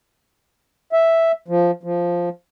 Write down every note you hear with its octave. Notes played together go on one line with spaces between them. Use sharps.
E5
F3
F3